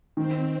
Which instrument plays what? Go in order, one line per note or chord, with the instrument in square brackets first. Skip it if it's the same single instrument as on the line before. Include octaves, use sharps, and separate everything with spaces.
[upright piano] D#3 [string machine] C4